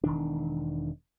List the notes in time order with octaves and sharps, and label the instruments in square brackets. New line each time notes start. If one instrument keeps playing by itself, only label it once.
[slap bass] E1 D#3 D4